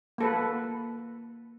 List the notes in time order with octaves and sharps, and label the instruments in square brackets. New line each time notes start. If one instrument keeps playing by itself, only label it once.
[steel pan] A#3 A4 B4